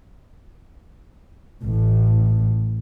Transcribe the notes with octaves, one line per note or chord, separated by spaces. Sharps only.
A1 A2